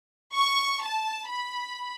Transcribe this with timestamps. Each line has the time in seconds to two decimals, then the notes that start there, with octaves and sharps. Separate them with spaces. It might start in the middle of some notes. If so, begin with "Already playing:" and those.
0.34 C#6
0.83 A5
1.29 B5